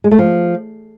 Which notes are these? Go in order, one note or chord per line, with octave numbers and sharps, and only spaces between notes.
G#3
A3
F3